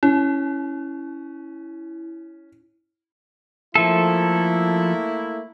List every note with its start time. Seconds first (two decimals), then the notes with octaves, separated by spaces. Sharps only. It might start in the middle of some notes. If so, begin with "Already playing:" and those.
0.03 C#4 E4
3.75 F3 A3 A#3 E4 A4